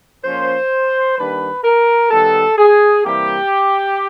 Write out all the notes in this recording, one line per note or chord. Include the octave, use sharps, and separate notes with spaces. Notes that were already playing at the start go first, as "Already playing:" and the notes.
F3 A#3 C#4 C5
D#3 G3 A#3 D4 B4
A#4
D#3 G3 B3 A4
G#4
C3 E3 G3 A#3 G4